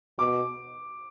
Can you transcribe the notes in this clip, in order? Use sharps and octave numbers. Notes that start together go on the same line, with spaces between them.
B2 D6